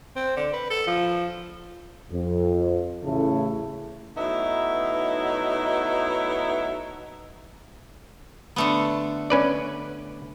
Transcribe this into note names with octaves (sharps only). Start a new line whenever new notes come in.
C4
D3
B4
A4
F3
F2
A1 C#3 A3 E4 A4
F#3 A3 B3 D#4 E4
D3 A3 B3
C#4 B4 D5